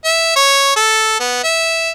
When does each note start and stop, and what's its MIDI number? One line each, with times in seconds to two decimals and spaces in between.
0.05 0.33 76
0.36 0.72 73
0.76 1.16 69
1.20 1.40 59
1.44 1.91 76